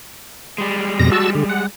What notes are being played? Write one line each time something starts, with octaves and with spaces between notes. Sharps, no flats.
G3 G#3
F2 B2 A#6
F#4 A5 E6
D3
F#5